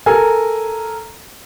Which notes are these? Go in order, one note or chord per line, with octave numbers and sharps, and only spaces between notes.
A4 A#4 G#5